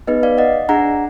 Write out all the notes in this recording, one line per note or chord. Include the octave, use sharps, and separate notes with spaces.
B3 D#4 G#4 B4 D#5
D5 F5
D#5 F#5
D4 G#4 F#5 A#5